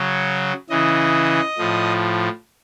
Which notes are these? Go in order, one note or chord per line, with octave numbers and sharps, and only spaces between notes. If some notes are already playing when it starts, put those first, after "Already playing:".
Already playing: C#3 F#3
C#3 E3 D#5
A2 F3